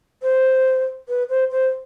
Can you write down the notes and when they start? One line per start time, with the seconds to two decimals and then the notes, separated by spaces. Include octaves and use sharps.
0.22 C5
1.09 B4
1.29 C5
1.51 C5